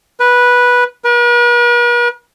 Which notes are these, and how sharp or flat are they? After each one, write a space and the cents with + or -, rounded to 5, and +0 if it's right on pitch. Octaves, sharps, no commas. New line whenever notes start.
B4 -10
B4 -45